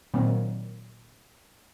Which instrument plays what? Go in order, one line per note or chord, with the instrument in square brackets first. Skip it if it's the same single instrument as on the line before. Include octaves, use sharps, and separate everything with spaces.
[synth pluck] A#2 D#3 F#3 A#3 C4